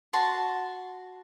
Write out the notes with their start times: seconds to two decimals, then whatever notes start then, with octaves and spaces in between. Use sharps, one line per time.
0.13 F#4 A5 C6